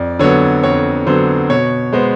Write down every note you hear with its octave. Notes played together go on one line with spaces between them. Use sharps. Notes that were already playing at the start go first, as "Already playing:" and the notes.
Already playing: F2 D5
D3 F#3 B3 C#5
F2 C#5
D3 F#3 B3 C5
B2 C#5
G#3 B3 C5